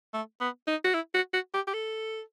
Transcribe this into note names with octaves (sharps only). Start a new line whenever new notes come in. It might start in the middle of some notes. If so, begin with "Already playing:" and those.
A3
B3
D#4
F#4
E4
F#4
F#4
G4
G4
A4